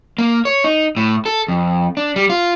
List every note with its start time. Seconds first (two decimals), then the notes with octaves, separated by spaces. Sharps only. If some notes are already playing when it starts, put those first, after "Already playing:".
0.18 A#3
0.45 C#5
0.64 D#4
0.97 A2
1.26 A4
1.48 F2
1.97 D4
2.16 G3
2.30 F4